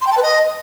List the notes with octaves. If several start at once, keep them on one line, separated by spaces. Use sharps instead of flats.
C6
G5
A5
B4
D#5